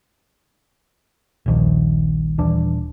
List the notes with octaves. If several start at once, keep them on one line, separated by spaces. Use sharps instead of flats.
D#1 A#1 D#2 F3
D#1 E3 D4